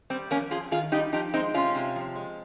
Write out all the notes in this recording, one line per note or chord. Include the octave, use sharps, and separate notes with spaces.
G3 C4
F2 A#3 C#4
F2 F4 G#4
D#3 F4 G#4
G3 D#4 G4
F3 D#4 G4
G#3 C4 D#4
C3 C#4 F4
C3
F3
G#3